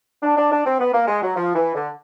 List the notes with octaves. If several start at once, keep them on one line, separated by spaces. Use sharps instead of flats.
D4
D4
D4
C4
B3
A#3
G#3
F#3
F3
E3
D3